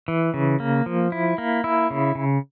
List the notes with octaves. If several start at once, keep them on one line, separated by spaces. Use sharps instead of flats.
E3
C#3
A#3
F3
E4
A#3
E4
C#3
C#3